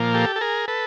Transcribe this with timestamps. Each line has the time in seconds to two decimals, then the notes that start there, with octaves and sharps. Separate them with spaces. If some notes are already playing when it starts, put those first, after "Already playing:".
Already playing: A#2 F3 A#3
0.14 G4 A4
0.36 A4
0.41 G#4 A#4
0.68 A4 B4